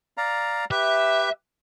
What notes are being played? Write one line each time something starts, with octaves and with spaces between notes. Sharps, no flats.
D5 F5 A#5
G4 B4 E5